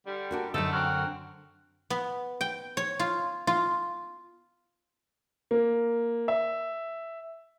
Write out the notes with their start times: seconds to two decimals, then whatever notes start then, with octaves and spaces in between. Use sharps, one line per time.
0.06 D3 G3
0.31 D4 F#4 A#4
0.54 F#2 D3 A3 D#4 A4
0.72 C4 F#4 A#4
1.90 B3
2.41 G5
2.77 C#5
3.00 F4
3.47 F4
5.51 A#3
6.28 E5